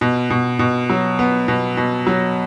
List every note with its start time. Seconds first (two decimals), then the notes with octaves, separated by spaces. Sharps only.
0.01 B2
0.30 B2
0.59 B2
0.90 F#3
1.19 B3
1.48 B2
1.77 B2
2.07 F#3